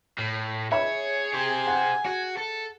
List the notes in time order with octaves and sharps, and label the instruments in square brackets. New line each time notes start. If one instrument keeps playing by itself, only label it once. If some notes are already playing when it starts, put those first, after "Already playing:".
[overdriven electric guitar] A2
[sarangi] G#4 [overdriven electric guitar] C#5 [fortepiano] E5 B5
[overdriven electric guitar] G4 C5 [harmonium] G#5
[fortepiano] F#5
[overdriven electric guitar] F#4
A4